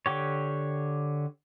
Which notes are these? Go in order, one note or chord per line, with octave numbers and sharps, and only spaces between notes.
D3 G4 C#5